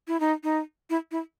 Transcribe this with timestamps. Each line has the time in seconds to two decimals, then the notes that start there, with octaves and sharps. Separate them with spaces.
0.08 E4
0.20 D#4
0.44 D#4
0.90 E4
1.12 E4